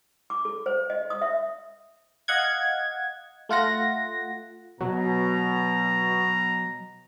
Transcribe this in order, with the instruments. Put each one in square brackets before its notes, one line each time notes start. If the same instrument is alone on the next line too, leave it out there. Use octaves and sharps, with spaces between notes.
[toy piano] D6
A4
C5
D#5
D#6
E5
[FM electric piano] D#5 F5 F#5 G#6
A3 F4 F#5 A#6
[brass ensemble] B2 [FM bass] F#3 [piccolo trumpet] A#5